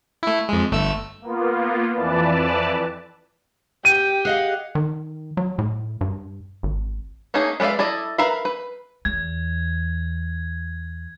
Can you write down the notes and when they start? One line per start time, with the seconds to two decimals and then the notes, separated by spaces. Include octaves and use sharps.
0.23 A3 E4
0.49 F2 G#3
0.72 G1 A3 E6
1.22 A#3 B3 F4
1.95 F2 E3 B4 D5 A5
3.85 G4 G5 D#7
4.25 G#4 D#5 F5 F#5
4.75 D#3
5.37 F#3
5.59 A2
6.01 G2
6.63 G#1
7.34 A3 A#3 C#4 D#4 G#4
7.60 G#3 B4 D5 E5 F5
7.79 E4 A4 D5 D#5
8.18 A#4 B4 E5 F5 B5
8.45 B4
9.05 E2 G#6